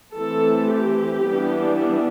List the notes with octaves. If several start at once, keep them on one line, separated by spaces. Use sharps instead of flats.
E3 A3 C4 A4
G4
E3 G3 B3 D4